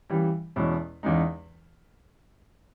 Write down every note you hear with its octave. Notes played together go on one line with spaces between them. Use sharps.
C#3 E3 G3
E2 B2 G#3 C#4 E4
E2 C#3 G#3 D#4